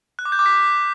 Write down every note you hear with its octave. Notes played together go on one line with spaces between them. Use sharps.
F#6
D6
G6
D6
B6